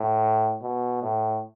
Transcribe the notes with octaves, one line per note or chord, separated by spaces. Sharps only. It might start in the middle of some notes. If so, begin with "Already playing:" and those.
Already playing: A2
B2
A2